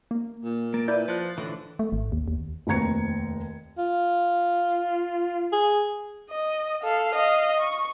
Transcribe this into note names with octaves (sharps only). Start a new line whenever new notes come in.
A#3
A#2
A#3 A6 D7
A#3 E4 B4 D5 G6
F3 F#6 A6
A2 D3 E3
A3
G#1
D#2
D#2
F1 D#2 C4 A#5 G#6 C#7
F4
G#4
D#5
A4 F5
D#5 F5
C#6